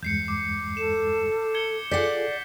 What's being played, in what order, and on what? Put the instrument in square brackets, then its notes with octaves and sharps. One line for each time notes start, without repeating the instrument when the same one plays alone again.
[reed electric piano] E2 G2 G#3 [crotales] G6 C7 C#7
[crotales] D6
[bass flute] A4 [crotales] E7
[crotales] G#6 C#7 G7
[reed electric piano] F4 G#4 A4 [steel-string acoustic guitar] D5 F#5 [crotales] G6 B6 C7